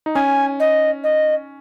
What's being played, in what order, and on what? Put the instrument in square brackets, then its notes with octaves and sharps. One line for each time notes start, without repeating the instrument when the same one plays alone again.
[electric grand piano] D#4
[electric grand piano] C#4 [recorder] G#5
[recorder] D#5
D#5